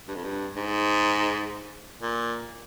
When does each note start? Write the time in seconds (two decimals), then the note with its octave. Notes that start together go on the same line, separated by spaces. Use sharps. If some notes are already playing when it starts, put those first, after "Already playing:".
0.08 G2
0.15 F2
0.24 G2
0.56 G#2
2.02 A#2